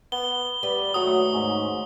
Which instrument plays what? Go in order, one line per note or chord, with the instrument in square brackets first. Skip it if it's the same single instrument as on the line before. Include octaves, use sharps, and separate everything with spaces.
[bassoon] B3 [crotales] G7
[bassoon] G3 [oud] B4
[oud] D#2 A3 [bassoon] F#3 [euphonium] F#4 [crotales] D#6
[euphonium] G#2 [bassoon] C#4